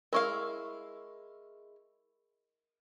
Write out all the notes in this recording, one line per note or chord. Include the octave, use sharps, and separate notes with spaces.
G#3 E4 A#4 F5 C#6